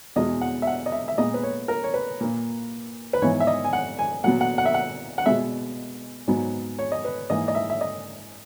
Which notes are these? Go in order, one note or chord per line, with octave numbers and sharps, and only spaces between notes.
E2 B2 G#3 D#5
F#5
E5
F#5
D#5
E5
E5
A#2 G#3 B3 D#5
B4
C#5
A#4
C#5
B4
A#2 A#3
B4
G#2 E3 B3 C#5
E5
D#5
G#5
F#5
G#5
A#2 F#3 B3 F#5
F#5
F#5
E5
F#5
F#5
B2 G#3 B3 E5
G#2 F#3 B3
C#5
D#5
B4
G#2 E3 A#3 D#5
D#5
E5
E5
D#5